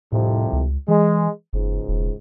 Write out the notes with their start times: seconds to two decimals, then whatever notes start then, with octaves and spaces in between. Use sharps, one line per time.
0.12 C2 F2 A2 C3
0.53 C#2
0.88 E3 G#3
1.53 F#1 C#2 G#2
1.88 E1